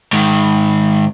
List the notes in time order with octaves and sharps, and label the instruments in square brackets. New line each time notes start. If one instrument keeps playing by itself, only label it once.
[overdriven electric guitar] G#2 D#3